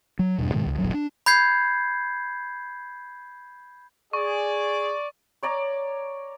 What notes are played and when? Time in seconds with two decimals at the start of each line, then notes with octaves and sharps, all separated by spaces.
0.19 F#3
0.38 E2 G2 B2
0.54 G#2 B2 D#3 G#3
0.66 C#2 C#3
0.78 D#1 A1 G2 F#3
0.94 D4
1.26 B5 G6 G#6 C7
4.13 G#4 D5 C#6
5.43 C#5 D5 A#5 D6